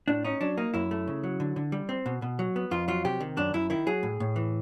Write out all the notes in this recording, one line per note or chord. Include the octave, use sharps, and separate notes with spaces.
A2 D4
C#4 D#4
F#3 D4
A#3 D#4
F#2 E4
A3
C#3
F#3
D3
D3
G3
C4
B2
B2
F#3
B3
F2 F4
F#3 F4
C3 G4
D#3
F#2 D4
F#2 E4
D#3 E4
F#3 G#4
A2
A2
E3